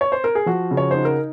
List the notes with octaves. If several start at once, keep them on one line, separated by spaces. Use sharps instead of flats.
C#5
C5
A#4
G#4
F3 F#4
C#3
C#5
D#4 C5
A#4